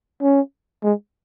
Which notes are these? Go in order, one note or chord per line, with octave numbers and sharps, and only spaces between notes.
C#4
G#3